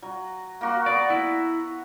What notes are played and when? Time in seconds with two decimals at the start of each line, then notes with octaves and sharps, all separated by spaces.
0.02 F#3
0.61 A#3 F#4
0.86 F#3 B3 D5
1.10 E4